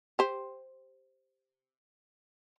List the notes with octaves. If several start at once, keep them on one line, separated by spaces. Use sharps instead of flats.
G4 C5